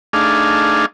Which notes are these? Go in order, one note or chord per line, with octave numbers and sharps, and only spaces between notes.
A3 D4 D#4 G#4 F5